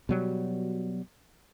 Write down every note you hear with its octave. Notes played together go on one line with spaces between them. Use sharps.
B2 F#3 G3